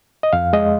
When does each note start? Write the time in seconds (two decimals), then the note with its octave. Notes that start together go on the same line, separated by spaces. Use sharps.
0.23 D#5
0.33 F2 F5
0.53 G#3 D#5